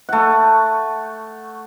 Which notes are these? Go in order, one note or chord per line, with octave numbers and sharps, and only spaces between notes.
A3 F#5